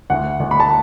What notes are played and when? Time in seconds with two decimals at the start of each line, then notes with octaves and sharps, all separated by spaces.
0.10 D2 F#5
0.40 D2
0.51 B5
0.60 A5